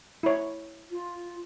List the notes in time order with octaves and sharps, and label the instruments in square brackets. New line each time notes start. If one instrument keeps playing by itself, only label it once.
[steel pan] E4 C#5
[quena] F4